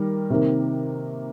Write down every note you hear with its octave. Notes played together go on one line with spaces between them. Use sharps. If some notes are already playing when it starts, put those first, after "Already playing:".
Already playing: D#3 G3 A#3
C3 D#3 A#3